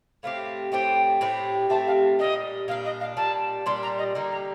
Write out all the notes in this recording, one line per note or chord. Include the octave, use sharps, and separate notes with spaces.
A2 A3 C4 G4 F5
A2 A3 C4 G4 G5
A2 A3 C4 G4
A2 A3 C4 G4 A5
F5
A#2 G3 D4 D#5
A#2 G3 D4 F5
D#5
F5
A#2 G3 D4 A5
A#2 G3 D4 C6
A#5
D#5
D3 G3 A#3 D#4
A#5